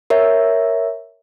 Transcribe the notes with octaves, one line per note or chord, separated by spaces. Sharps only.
A#4 C#5 E5